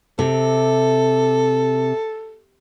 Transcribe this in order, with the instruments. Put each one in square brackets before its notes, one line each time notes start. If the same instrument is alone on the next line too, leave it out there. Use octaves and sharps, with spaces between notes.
[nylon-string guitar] C3 [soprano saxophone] A4